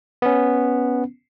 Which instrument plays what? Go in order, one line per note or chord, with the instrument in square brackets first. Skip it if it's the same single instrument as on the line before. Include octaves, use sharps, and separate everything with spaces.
[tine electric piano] B3 C#4